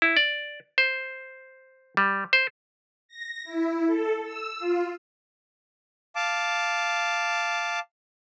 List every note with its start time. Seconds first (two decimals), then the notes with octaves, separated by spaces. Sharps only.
0.02 E4
0.17 D5
0.78 C5
1.97 G3
2.33 C5
3.08 A#6
3.44 E4
3.87 A4
4.23 E6
4.59 F4
6.16 F5 A5 D6